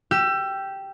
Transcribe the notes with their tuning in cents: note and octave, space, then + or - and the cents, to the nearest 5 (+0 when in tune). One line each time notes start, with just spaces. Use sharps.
G4 -5 E6 +30